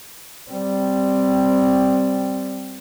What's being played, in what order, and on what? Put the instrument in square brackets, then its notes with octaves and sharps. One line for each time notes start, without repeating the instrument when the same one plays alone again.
[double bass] G3 C4